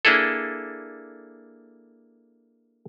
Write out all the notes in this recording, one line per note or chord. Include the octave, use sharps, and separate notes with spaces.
A#3 D4 E4 G#4 A4